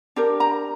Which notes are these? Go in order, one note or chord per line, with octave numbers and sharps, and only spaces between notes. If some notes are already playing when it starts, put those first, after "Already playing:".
D4 G4 A#4
A#5